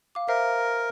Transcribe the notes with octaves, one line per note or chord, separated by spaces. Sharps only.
F5 D6
A#4 C5 E5 F5